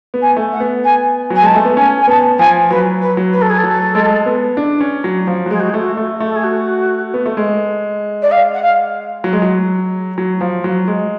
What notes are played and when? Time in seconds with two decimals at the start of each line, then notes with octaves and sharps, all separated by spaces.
0.14 B3
0.21 G#5
0.37 A3
0.52 F#5
0.60 B3
0.84 G#5
1.30 F#3 G#5
1.42 G#3 A5
1.54 A3
1.65 B3
1.77 C#4 G#5
2.01 G#5
2.07 B3 A5
2.38 F3 G#5
2.70 F#3 B4
3.02 B4
3.17 F#3
3.32 B4
3.41 A4
3.49 G#4
3.58 A4
3.63 F#3
3.95 G#3
4.26 B3
4.57 D4
4.81 C#4
5.04 F#3
5.27 F3
5.46 F#3
5.50 G#3 G#4
5.60 F#4
5.69 G#4
5.74 A3
5.81 F#4
5.97 A3
6.20 A3
6.26 A4
6.35 G#4
6.43 F#4
7.14 B3
7.26 A3
7.37 G#3
8.22 D5
8.31 F5
8.54 F#5
8.62 F5
9.24 F#3
9.33 G#3
9.42 F#3
10.18 F#3
10.41 F3
10.64 F#3
10.88 G#3